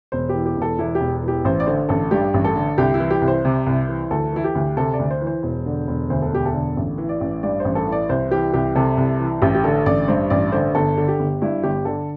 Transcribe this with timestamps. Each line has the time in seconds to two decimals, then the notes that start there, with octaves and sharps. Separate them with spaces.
0.12 E1 C5
0.29 E3 G4
0.46 G4
0.57 E1 A4
0.79 E2 E4
0.95 G4
1.01 E1
1.22 E3
1.28 G4
1.45 A1 C5
1.60 D5
1.66 D3 C5
1.89 A1 A4
2.11 G2 G4
2.34 A1
2.44 A4
2.56 D3
2.78 C2 G4
2.94 E4
3.00 E3
3.11 G4
3.21 C2
3.28 C5
3.45 C3
3.66 C2
3.89 E3
4.11 D2 A4
4.33 E3 E4
4.44 G4
4.55 D2
4.77 C3 A4
4.93 D5
4.99 D2
5.11 C5
5.21 E3
5.27 C5
5.43 E1
5.66 D3
5.88 E1
6.10 D2 C5
6.22 A4
6.32 E1 G4
6.45 A4
6.54 D3
6.77 A1
6.98 E3
7.09 D5
7.21 A1
7.43 G2 D5
7.60 A1 C5
7.75 A4
7.87 E3
7.92 D5
8.09 C2 C5
8.31 E3 G4
8.53 C2 G4
8.75 C3 A4
8.97 C2
9.20 E3
9.42 A1 G4
9.55 G4
9.64 D3 A4
9.86 A1 D5
10.08 G2 C5
10.30 A1 D5
10.52 D3 C5
10.75 G1 A4
10.97 D3
11.08 G4
11.19 G1
11.42 G2 E4
11.63 G1 G4
11.85 D3 A4